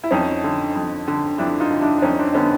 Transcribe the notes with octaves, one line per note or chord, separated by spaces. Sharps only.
E4
F2 C#4 D#4
D3
F2
D3
F2 D4 E4
D#4 F4
D3
D4 E4
D4
F2 C#4 D#4
C4 D4
D3 B3 C#4